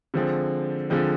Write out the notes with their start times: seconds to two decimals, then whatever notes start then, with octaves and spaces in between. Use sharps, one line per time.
0.14 D3 F3 G#3 C4
0.90 D3 F3 G#3 C4